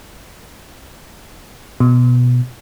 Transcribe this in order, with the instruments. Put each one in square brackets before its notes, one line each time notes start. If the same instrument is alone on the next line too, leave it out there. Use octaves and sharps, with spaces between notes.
[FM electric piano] B2